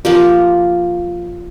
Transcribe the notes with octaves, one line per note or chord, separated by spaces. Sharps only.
F3 A#3 G4